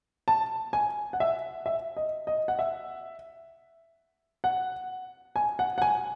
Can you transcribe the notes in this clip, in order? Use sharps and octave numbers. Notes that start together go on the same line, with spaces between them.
A5
G#5
F#5
E5
E5
D#5
D#5
F#5
E5
F#5
G#5
F#5
F#5
G#5